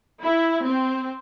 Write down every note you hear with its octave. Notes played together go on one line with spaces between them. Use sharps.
E4
C4